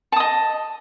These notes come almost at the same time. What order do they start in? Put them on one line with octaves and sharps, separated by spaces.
A5 D#6 D#5